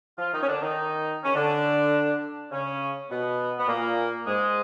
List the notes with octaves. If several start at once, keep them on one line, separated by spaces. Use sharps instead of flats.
F3 F4
D#3 D#4
C#4
D3 D4
D#3 D#4
C#4
D3 D4
C#3 C#4
B2 B3
B3
A#2 A#3
G#2 G#3